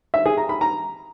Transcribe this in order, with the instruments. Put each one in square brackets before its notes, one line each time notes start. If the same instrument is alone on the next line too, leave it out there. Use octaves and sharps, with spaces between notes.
[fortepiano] E5
G#4
A#5
B5
A#5